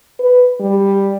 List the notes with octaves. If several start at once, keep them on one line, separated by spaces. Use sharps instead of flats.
B4
G3